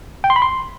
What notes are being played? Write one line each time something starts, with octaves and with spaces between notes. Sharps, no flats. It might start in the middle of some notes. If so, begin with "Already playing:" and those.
G5
C6
B5
C6